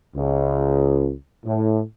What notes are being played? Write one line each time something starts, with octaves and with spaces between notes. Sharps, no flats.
C#2
A2